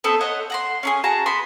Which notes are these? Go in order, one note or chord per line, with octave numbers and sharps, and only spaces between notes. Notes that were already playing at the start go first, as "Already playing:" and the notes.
B3 C4 A4
C5 C#5 D#5 F#5
F#5 A#5 C6
C#4 D4 G#4
F#4 G#4 A5 A#5
B3 B5 C6